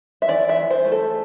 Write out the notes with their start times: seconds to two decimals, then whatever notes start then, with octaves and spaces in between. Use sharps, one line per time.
0.22 E5
0.28 E3 D5
0.49 E5
0.56 E3
0.71 C5
0.84 A3
0.92 A4